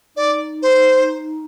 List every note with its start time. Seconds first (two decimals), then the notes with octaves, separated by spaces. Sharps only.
0.16 D#4 D5
0.62 C5